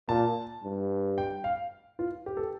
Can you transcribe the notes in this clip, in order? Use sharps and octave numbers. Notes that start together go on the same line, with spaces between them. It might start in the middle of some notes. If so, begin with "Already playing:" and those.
A#2 A5
G2
G5
F5
F4
G4
A4